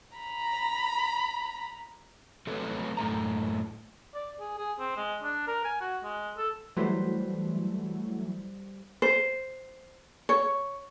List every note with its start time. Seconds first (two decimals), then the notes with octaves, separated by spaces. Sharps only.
0.18 A#5 B5
2.47 F#3 A3 C4 A4 B4 C#5
2.97 F#2 A2 A3 A#5
4.14 D5
4.40 G#4
4.58 G#4
4.79 C4
4.97 G#3
5.22 D4
5.47 A#4
5.64 G#5
5.81 F#4
6.03 G#3
6.37 A4
6.77 E3 F#3 G3 A3 B4 C5
9.02 C5
10.29 C#5